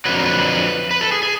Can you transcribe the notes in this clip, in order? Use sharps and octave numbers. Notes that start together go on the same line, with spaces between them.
F2 D3 F#3 B4
A#4
B4
B4
A4
G#4
G#4